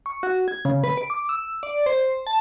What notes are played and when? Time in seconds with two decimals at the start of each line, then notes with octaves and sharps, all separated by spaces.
0.06 C#6
0.23 F#4
0.48 G#6
0.65 C#3
0.84 B4
0.97 D7
1.10 D6
1.29 E6
1.63 D5
1.86 C5
2.27 A5